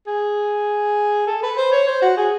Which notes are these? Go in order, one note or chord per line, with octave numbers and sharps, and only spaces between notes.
G#4
A4
B4
C5
C#5
C5
F#4
G#4